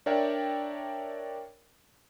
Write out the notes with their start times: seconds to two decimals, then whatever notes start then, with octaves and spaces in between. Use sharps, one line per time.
0.06 D4 A#4 C#5 D5 E5 G5